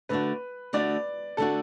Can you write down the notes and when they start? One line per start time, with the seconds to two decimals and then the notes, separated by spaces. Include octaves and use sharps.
0.09 D2 D3 A3 D4 F#4 B4
0.73 D2 D3 A3 D4 F#4 D5
1.37 D3 A3 D4 F#4 A4